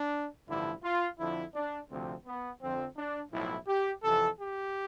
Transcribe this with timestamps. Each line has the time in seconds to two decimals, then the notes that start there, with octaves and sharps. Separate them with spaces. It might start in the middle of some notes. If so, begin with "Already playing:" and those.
Already playing: D4
0.49 A1 G2 D3 F3 E4
0.83 F4
1.19 F2 D3 F3 E4
1.54 D4
1.90 D2 C3 F3 C4
2.26 B3
2.61 F2 D3 F3 C4
2.97 D4
3.32 B1 A2 F3 E4
3.67 G4
4.03 F2 C3 E3 A4
4.39 G4